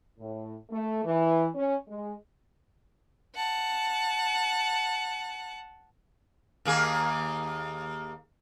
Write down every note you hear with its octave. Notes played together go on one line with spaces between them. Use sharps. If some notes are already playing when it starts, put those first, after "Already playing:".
A2
A3
E3
C#4
G#3
F#5 A5
D#2 A#3 G#4